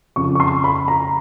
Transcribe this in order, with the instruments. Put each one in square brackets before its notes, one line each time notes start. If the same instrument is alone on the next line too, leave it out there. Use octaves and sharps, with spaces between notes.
[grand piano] F2 C#3 F3 C#6
C#6
C6
B5
A#5